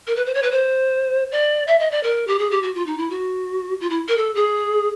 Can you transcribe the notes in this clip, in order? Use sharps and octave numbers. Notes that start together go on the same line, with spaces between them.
A#4
B4
C5
C#5
B4
C5
D5
E5
D#5
D5
A#4
G4
G#4
G4
F#4
F4
D#4
E4
F#4
F4
E4
A#4
A4
G#4